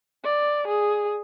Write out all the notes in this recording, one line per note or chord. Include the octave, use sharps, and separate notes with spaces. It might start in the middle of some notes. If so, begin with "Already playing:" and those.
D5
G#4